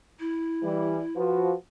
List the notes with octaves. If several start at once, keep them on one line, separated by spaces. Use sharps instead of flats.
E4
E3 G3
F3 F#4 B4